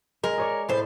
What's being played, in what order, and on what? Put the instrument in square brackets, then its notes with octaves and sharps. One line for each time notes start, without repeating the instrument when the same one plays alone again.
[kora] G#3 [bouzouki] A#4
[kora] G#4 C#5 D5
[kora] A2 A4 [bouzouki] B4 C5